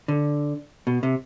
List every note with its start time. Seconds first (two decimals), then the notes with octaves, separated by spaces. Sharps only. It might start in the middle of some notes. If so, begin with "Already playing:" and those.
0.08 D3
0.87 B2
1.03 C3